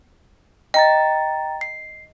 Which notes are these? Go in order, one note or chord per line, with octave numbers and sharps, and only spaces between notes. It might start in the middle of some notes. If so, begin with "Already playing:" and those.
D#5 G5 A#5 A6
C7